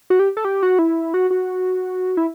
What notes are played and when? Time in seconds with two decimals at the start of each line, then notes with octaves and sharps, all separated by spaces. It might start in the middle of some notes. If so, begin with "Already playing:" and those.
0.10 F#4
0.19 G4
0.37 A4
0.45 G4
0.63 F#4
0.79 E4
1.14 F#4
1.30 F#4
2.17 E4